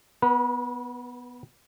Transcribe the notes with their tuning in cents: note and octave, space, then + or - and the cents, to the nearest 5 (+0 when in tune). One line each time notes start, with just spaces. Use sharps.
B3 +0 B4 -40